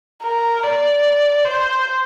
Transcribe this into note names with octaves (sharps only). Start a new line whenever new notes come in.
A#4
D5
C5